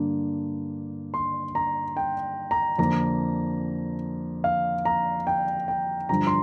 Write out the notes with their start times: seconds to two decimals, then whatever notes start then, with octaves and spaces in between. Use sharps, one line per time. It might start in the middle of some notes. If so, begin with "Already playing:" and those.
Already playing: G2 D3 A#3 D4
1.14 C6
1.55 A#5
1.97 G5
2.51 A#5
2.78 F2 D3 A#3 D4 A#5
4.44 F5
4.85 A#5
5.27 G5
5.68 G5
6.09 G2 D3 F3 A#5
6.27 C6